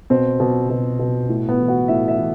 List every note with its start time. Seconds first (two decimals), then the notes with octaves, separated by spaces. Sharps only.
0.10 B2 C4
0.40 B2
0.70 B2
0.99 B2
1.29 A2
1.49 B3
1.59 E3
1.68 F#4
1.88 A2 E5
2.08 E5
2.18 E3